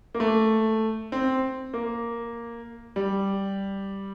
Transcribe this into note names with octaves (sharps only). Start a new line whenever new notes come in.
A#3
A3
C4
A#3
G3